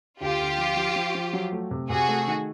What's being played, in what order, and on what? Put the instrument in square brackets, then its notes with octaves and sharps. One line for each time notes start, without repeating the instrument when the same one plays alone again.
[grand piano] D2 [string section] F4 G4
[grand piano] D2
F3
F3
F3
F3
F#3
A3
C3
[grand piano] C3 [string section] F#4 G#4
[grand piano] A3
D#3